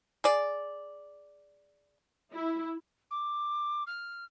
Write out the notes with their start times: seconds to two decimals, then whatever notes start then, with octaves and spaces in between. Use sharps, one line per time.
0.24 G#4 D5
2.33 E4
3.11 D6
3.87 F6